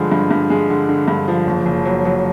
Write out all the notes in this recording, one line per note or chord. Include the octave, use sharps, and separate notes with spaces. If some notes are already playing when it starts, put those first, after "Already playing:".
Already playing: G2 D3 F3 G#3
G2
G2
G#3
D3
D3
G2
F3
F#1
F#1
F#3
F#3